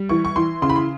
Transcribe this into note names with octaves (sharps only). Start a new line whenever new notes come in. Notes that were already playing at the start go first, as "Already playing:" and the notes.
Already playing: G3
E3 C#6
C#6
E3 C6
C#3 C6
B5
C6